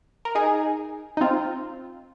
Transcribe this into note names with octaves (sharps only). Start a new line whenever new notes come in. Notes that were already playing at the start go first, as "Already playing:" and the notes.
A#4
D#4 G#4
D#4
C4 F4